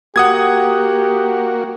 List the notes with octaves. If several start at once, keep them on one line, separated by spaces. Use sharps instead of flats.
A#3 F#4 G4 F#5 D#6 G#6